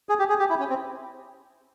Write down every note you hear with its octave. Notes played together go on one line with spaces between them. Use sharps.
G#4
G4
G#4
G4
E4
C#4
C4